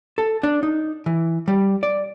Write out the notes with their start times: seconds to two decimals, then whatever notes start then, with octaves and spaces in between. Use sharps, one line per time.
0.18 A4
0.43 D4
0.63 D#4
1.06 E3
1.48 G3
1.83 D5